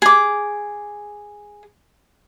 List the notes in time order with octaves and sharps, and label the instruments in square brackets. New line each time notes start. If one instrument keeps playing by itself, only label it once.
[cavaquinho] G#4 D6